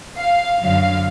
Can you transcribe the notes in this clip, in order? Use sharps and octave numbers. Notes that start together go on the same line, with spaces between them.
F5
F#2 D3 F#3 F5